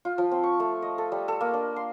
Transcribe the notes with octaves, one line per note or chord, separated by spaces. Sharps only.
F4
F3
C4
C#6
A3
D#5
A4
G3
A4
A#3
D4
C6